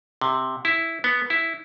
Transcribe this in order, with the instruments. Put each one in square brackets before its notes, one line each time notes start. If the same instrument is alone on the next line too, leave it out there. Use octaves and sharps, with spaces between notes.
[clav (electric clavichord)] C3
E4
B3
E4